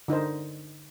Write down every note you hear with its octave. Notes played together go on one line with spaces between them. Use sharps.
D3 D#4 A#4 C5